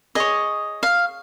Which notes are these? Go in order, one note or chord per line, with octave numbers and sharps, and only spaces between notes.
G#4 C#5 D#5
F5